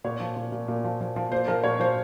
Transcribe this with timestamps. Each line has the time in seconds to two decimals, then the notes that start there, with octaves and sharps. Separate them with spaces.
0.04 A#2 C#5
0.20 F3
0.36 A#2
0.52 A#2
0.68 A#2
0.84 F3
1.01 F3
1.16 F3
1.32 A#2 C5
1.48 F3 A#4
1.64 A#2 C#5
1.80 F3 C5